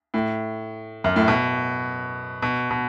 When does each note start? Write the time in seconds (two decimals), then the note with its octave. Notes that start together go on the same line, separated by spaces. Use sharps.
0.14 A2
1.04 F#2
1.16 A2
1.28 B2
2.42 B2
2.70 B2